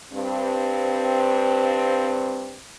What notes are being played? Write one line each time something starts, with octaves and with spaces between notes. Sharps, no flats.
G2 C4